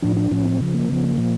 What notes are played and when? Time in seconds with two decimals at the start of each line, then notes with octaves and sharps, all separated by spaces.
0.02 A2 F3 D4
0.16 D4
0.31 A2 F3 C#4
0.45 C4
0.60 C#3 F3
0.74 A#3
0.89 C#3 F3 B3
1.04 A#3
1.18 A#2 F3